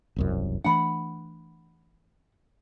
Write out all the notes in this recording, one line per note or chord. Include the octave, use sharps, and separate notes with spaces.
E1 C2 F#2
E3 A3 D4 F#5 B5